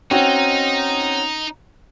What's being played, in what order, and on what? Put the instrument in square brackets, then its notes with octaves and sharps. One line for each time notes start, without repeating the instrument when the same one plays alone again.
[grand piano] C4 C#4 F#4 [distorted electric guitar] D#4